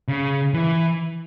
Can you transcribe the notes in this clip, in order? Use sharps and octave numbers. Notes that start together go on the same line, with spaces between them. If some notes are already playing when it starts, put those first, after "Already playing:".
C#3
E3